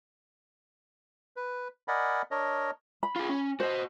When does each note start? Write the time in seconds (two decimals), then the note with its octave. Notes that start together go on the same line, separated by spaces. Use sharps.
1.36 B4
1.88 A#4 D5 D#5 F#5 G#5 B5
2.31 D4 A#4 C#5 D#5
3.03 B5
3.16 F4 G#4
3.29 C#4
3.60 F#4 C5 D#5